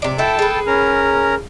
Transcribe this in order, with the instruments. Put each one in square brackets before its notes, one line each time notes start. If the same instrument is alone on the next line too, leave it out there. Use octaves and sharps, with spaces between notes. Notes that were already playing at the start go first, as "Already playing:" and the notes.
[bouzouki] C3 D5
[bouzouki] E4 F#4 [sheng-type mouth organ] A4 G5 A5
[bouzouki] G#4 B4
[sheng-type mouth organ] C#4 A#4 A#5